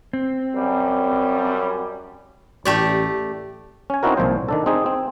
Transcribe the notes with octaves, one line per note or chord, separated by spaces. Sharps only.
C4
F#2 G3
A1 A3 G4 D5
C#4 G#5
C4 C#4 D#4 E4 F#4 A#4
C2 A#2 F3 C5
D#3 D4 A4
C4 D#4 G#4
C4